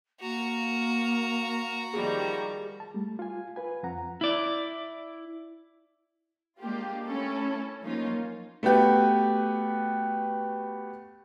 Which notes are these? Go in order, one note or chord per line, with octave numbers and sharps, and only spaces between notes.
A#3 F#4 A#5
D#3 F3 G3 G#4
A5
G3 A3
F4 G#5
F4 B4 G#5
F2 F3 C4 F#5 A#5
E4 D5
G#3 A#3 D4 F4 G4
A3 C#4 E4 A4
F3 F#3 A#3 C#4 D#4 F4
A3 B3 F#4 G4 B4